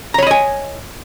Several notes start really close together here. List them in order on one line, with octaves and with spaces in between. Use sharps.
A#5 C#5 B5 D#5 G#5